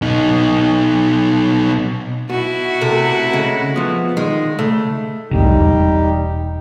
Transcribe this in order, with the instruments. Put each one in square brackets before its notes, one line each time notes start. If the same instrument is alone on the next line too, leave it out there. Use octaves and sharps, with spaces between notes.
[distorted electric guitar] B2 D#4
[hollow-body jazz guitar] B2 [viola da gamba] E4 F#4
[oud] C3 A3 A#4
[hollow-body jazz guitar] C#3 [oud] G#3
[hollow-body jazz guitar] F3 B3
[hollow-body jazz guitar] D#3 [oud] G#3
[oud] C#3 [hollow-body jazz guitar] A3
[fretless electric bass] F1 C2 A2 [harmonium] G3 D#4 G4
[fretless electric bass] E1